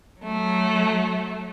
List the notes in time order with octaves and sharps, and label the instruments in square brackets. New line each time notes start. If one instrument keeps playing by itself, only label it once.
[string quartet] F#3 A3